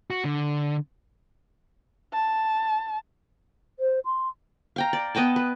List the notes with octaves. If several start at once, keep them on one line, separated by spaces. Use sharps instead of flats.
F#4
D3
A5
C5
C6
F5 G5 A#5
D5
B3 D#5 G5 A5
B4